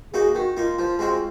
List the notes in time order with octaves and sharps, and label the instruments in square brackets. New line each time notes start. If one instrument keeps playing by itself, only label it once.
[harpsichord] A#3 D#4 F#4 [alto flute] G#4
[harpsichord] D#3 [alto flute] F#4
[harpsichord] A#3 D#4 [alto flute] F4
[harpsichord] F3
G#3 C4 F#4